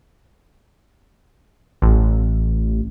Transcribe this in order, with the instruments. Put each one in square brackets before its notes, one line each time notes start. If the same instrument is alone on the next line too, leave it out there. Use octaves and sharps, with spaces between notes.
[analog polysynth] A1